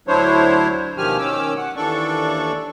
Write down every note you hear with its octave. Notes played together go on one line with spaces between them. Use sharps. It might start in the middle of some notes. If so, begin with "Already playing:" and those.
D2 F#3 D4 E4 C5 C#5
B2 D#3 F3 G4 G#5 F6
D#3 C#4 D6 E6
F#5
D#2 E3 D4 A4 D5 C#6